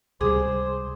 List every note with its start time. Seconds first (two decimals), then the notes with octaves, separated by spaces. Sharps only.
0.21 C#2 C3 G3 G#4 C5 D6 D#6